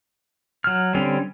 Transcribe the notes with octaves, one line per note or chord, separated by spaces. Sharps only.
F#3 F6
D3 G3 C4 C#4